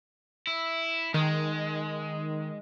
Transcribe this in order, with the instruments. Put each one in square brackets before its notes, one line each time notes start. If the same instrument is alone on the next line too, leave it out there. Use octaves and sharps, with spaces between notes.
[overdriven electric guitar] E4
[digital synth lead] D#3 [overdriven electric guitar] G#3